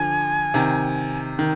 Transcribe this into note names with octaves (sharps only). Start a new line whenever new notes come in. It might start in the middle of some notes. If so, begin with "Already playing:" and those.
Already playing: D3 F3 G#5
C3 D#3
D#3